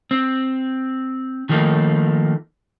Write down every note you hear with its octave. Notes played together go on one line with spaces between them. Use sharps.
C4
D#3 F3 A3 A#3 D#4